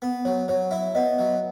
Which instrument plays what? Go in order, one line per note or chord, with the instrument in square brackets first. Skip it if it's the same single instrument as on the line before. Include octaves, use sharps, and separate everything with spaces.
[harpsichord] B3
[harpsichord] F#3 [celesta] C#5
[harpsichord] F#3 [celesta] C#5
[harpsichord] E4 [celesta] E5
[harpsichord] B3 [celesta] D#5
[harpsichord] F#3